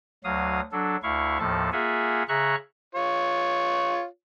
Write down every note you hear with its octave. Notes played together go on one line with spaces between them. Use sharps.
D2 F#3 F5 D#6
F#3 D4 A4
D2 E4 F5 C#6
D#2 A2 F3 A4 A5
A#3 F4 G#4 E5 F#5 G#5
C#3 G#4 E5 A#5 C#6 F#6
F4 C#5